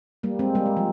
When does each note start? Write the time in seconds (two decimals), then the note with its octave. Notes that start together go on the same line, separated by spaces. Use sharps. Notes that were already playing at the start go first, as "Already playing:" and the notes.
0.23 G3 A#3
0.39 G#3 C4
0.55 G3 A#3
0.66 G#3
0.77 F3